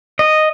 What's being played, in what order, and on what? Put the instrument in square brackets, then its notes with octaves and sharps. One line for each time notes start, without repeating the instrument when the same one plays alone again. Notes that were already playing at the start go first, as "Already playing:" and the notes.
[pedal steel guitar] D#5